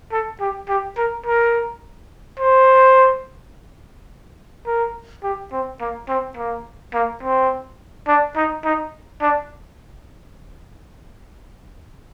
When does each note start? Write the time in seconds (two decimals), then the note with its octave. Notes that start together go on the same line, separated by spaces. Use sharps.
0.12 A4
0.40 G4
0.69 G4
0.97 A#4
1.26 A#4
2.40 C5
4.67 A#4
5.23 G4
5.52 C4
5.81 A#3
6.09 C4
6.37 A#3
6.94 A#3
7.23 C4
8.08 D4
8.36 D#4
8.65 D#4
9.21 D4